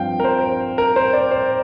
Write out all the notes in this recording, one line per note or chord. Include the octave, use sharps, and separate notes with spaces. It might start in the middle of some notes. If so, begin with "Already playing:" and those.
Already playing: G2 F3 C4 F5 G5
A#4
C5
A#4
C5
D5
C5